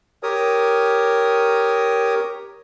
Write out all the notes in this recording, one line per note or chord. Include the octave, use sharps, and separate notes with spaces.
G4 A#4 C#5 D#6